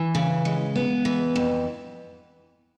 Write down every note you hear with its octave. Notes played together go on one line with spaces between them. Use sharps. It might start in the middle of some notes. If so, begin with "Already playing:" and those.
Already playing: E3
C#3
G#3
B3
E3
F2